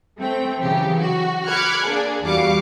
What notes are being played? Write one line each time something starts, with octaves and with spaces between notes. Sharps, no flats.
A3 C4 G5
C#3 E3 F#3 G4
F#4
B5 D6 F6 F#6 G#6 C#7
A#3 D4 G#4
E2 G3 F#4 F5 D6 C#7